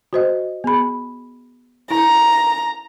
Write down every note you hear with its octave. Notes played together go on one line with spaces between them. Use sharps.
F#4 C5 D#5
B3 G#4 B5
E4 A#5